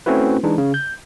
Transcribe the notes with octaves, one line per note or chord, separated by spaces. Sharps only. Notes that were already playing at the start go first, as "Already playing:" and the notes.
A3 C4 C#4 E4 F#4 B4
E3 G#3 D4 D#4
C#3
G6